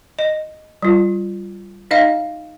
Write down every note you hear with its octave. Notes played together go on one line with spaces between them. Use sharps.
D#5
G3 F4
D#4 D#5 F5